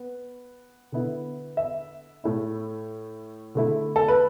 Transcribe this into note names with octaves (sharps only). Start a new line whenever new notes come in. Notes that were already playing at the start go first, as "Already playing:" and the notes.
Already playing: B3
D3 B3 E4
E5
A2 A3 E4
D3 A3 E4
A4
B4